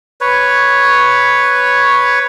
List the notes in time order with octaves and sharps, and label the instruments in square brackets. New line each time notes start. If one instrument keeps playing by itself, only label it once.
[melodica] B4 C#5